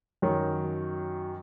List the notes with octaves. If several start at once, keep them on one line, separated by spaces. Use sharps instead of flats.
F#2 D#3 F#3 C#5